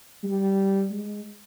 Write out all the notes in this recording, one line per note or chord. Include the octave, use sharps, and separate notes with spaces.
G3
G#3